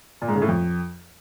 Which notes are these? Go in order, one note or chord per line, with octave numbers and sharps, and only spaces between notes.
A#2
G#2
C#3
A2
F2